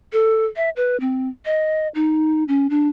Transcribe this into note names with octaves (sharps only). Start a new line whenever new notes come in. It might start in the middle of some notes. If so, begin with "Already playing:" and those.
A4
E5
B4
C4
D#5
D#4
C#4
D4